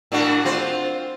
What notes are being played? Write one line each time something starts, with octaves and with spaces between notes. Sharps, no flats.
A2 D4 F#4
C4 F4 C5